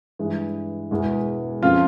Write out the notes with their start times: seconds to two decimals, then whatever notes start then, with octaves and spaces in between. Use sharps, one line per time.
0.19 G2 E3 G#3
0.91 E1 E2 E3 G#3
1.62 F2 C#3 F3 F4 F5